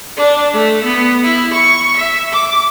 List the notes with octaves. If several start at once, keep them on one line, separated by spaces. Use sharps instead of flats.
D4
A3
B3
E4
C#6
E5
D6